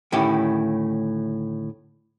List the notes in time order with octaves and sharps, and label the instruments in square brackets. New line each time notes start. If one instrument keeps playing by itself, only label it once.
[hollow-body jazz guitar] D2 A2 D#3 C#4 E4 G4